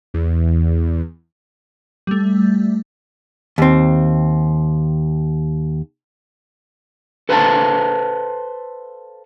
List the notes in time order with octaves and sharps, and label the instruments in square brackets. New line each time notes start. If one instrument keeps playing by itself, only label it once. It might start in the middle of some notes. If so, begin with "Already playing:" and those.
[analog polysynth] E2
[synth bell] G3 A3
[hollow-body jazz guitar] D#2 C4
[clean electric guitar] A4 B4 C5 F5 G5 A5